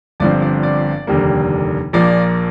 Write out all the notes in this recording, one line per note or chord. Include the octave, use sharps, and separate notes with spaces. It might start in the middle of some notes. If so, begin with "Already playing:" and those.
G1 G2 F3 C4 D5
D5
D5
F1 D#2 D3 G3 A#3
A#1 A#2 F3 A#3 D5